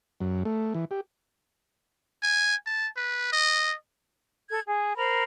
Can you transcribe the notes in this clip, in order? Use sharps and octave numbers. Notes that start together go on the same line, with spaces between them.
F#2
A3
E3
G4
G#5
A5
B4
D#5
A4 G#6
G#4
A#4 C5 B5